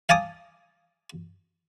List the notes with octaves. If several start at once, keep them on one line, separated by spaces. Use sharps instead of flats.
F5 G#5 A5 D6 D#6